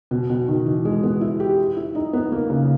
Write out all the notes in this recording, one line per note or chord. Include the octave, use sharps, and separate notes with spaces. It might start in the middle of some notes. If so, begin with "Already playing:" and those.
B2
B2
D#3
E3
G#3
B3
E4
G4
E4
D#4
B3
A#3
C#3